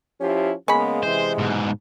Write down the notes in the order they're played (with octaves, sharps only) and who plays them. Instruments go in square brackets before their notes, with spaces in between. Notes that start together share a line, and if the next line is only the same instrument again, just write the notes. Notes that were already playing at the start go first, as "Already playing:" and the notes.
[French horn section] F3 E4 G4 [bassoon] C#4
[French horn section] C#3 A#3 B3 [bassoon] G#3 [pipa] C#4 B5
[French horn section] C3 E3 [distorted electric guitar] C5
[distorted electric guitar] G#2 B2